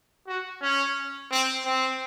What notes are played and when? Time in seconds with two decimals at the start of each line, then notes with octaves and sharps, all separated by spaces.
0.28 F#4
0.62 C#4
1.31 C4
1.65 C4